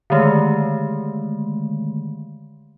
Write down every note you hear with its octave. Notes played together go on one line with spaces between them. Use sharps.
D3 D#3 G#3 A3